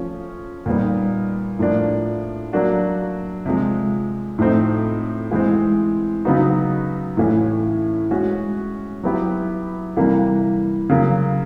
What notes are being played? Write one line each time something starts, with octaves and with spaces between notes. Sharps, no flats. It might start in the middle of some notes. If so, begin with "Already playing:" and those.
Already playing: F3 A3 C#4
A#2 G3 B3 D#4
A2 F3 A#3 D4
F#3 A#3 D4 F#4
C3 F3 G#3
A2 F3 A3 C4 D#4
E3 G#3 C4
C#3 F#3 B3 D#4 F#4
A2 E3 A3 C#4
G#3 C#4 F#4
F#3 B3 E4 G4
C3 E3 G3 A#3
C#3 F#3 A#3